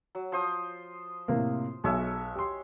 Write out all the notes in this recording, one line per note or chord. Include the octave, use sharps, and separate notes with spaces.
F#3
F3 C5 D#6
A2 C3 A#3
B1 G#3 C#5 E5
G4 C6